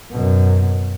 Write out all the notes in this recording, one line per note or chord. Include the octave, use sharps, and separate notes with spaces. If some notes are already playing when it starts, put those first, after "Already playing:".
F#2 B2